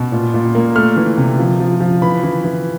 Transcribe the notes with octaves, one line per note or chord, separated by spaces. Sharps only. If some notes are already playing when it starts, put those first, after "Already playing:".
Already playing: B2
A#2
A#2
A#3
A3 F6
E3
C3
F3
F3
F3
E3 B5
E3
E3